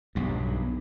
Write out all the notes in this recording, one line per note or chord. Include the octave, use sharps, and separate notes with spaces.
B1 G2